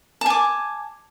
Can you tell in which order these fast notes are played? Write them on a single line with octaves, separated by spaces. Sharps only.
A5 G#5 D6